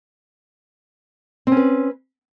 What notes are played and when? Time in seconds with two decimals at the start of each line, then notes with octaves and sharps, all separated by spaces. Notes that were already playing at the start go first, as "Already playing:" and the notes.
1.47 C4
1.52 C#4
1.57 B4